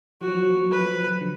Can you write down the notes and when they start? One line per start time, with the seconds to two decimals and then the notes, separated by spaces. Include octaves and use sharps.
0.21 F3 F#4
0.28 F#3
0.35 F3
0.43 F#3
0.50 F3
0.57 F#3
0.64 F3
0.71 F#3 B4
0.79 F3
0.86 F#3
0.94 F3
1.01 F#3
1.08 F3
1.21 D3